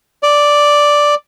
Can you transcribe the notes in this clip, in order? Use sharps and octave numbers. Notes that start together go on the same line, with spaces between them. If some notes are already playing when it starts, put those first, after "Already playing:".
D5